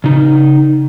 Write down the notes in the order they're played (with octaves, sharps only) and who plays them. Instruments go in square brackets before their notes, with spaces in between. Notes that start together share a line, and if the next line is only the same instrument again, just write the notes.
[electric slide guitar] C#3 D#4